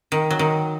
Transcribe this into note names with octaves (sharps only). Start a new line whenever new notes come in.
D#3
F#3
D#3